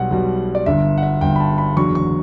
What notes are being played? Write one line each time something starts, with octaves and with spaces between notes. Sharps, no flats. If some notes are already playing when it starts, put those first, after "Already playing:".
Already playing: B1 B2 G3 F#5
B1 B2 G3
D5
G1 G2 D3 E5
F#5
E5
G1 G2 D3 G5
B5
A5
B5
F#1 E2 D3 F#3 C#6
C#6